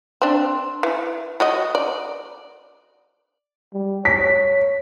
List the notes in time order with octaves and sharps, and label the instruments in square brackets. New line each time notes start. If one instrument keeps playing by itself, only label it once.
[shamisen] C4 D4
E3
F#3 F#4 D#5
D5
[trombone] G3
[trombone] C#5 [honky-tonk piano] B6